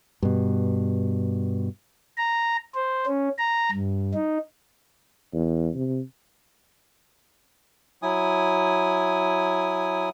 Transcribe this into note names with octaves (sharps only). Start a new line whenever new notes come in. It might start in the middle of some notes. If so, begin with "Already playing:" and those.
G2 B2
A#5
C5
C#4
A#5
G2
D#4
E2
C3
F#3 E4 G#5 D#6